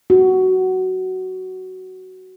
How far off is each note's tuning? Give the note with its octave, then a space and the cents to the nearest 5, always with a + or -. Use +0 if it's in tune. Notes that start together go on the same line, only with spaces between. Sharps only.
F#4 +10